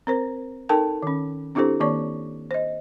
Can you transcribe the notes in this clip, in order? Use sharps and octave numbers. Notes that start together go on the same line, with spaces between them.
C4 A#4 C5
D#4 A4 A#4 G5 A5
D#3 C#4
C4 D4 E4 G4 A4 C5
D#3 A#3 C#5 D5 C#6
C5 D#5